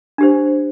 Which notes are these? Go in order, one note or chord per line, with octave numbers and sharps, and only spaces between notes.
D4 G4 C5